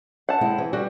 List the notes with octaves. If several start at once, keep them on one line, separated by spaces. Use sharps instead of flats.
F#5 A5
G#3 C4 E4
E3
G3 F#4